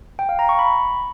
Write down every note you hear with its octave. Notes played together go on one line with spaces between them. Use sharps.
G5
F5
A#5
C#6
B5